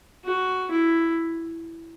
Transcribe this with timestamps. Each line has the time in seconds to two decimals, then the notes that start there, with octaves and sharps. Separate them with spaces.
0.25 F#4
0.71 E4